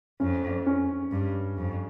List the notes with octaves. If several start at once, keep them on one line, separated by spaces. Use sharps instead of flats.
F2 C#4
C#4
G2
F2